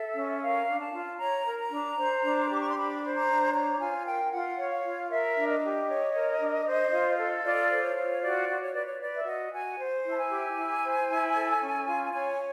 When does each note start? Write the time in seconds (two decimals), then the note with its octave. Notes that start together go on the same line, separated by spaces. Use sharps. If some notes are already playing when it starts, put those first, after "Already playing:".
Already playing: A4 E5
0.14 C#4
0.41 A#4 F5
0.67 D4
0.80 A5
0.93 F4
1.19 C#5 A#5
1.45 A#4
1.59 A#5
1.71 D4
1.97 C5
2.23 D4
2.49 G4 D6
2.61 C#6
2.69 C6
2.76 D4 B5
3.02 C5
3.14 A#5
3.27 D4
3.53 C#5 A#5
3.80 F4 G#5
4.05 A#4 G5
4.32 F4 F#5
4.57 C#5
4.70 F5
4.83 F4
5.09 A#4 E5
5.35 D4
5.48 D#5
5.62 G4
5.88 C#5
6.13 A#4
6.40 D4
6.66 C5
6.91 F4
7.17 A4
7.44 F4 D5
7.70 C5
7.83 C#5
7.96 F4
8.22 F#4 D5
8.48 F#4
8.61 C#5
8.74 B4 D5
8.86 C#5
9.00 B4 D5
9.15 E5
9.26 F#4 D#5
9.52 F#4 G#5
9.78 C5
10.04 E4
10.12 A5
10.17 G#5
10.31 G4
10.57 E4
10.83 C5
11.09 E4
11.35 A4
11.60 C#4
11.86 F4
12.12 C#5 G#5